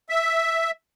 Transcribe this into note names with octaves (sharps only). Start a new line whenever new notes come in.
E5